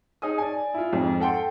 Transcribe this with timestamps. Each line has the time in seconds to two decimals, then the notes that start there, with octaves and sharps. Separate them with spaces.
0.22 D#4 G#4 D#6
0.38 D5 G#5
0.74 E4 F4
0.93 F2 G#2
1.20 A4 F#5 G5 C6